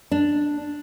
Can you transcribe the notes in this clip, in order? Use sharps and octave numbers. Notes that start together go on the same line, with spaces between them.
D4